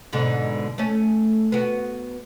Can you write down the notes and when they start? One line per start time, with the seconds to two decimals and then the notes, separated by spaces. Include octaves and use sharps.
0.13 G#2 B2 D3
0.78 A3 C#4
1.52 B3 F#4